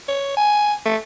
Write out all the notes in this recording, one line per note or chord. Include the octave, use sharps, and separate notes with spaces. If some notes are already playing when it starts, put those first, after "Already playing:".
C#5
G#5
A3